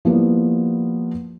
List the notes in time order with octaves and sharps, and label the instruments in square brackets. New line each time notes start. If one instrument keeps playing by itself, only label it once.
[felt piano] F3 G3 A#3 B3 E4